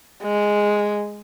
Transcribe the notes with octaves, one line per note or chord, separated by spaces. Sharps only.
G#3